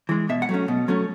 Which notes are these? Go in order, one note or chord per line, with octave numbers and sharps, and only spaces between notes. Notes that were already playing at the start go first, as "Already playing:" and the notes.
E3 G#3
B2 E5
F#5
F#3 A3 C#4
B2
F#3 A3 C#4